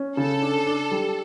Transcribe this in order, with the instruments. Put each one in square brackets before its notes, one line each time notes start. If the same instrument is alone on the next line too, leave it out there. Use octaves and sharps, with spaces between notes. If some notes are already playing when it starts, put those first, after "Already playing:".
Already playing: [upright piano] C#4
[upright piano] C#3 [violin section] A4
[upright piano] D4
D4
G3